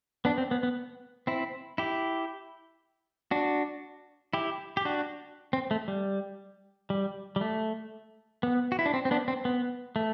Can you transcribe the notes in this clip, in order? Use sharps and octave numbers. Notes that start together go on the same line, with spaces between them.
B3 D4
C4
B3
B3
C4 E4
E4 G4
D4 F#4
E4 G4
G4
D4 F#4
C4
A3
G3
G3
G3
A3
B3
F#4
E4
D4
C4
C4
B3 D4
C4
B3
A3